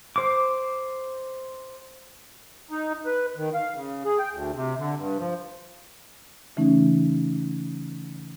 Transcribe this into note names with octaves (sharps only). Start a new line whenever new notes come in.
C5 D6
D#4
B4
D#3
F5
C#3
G#4
G5
D2
C3
D3
G2
F3
C#3 E3 A3 C#4 D#4